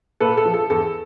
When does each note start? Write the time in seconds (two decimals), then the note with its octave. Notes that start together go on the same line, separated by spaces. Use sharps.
0.20 A#2 A4 B4
0.37 A4
0.45 F3
0.54 A4
0.70 E2 A4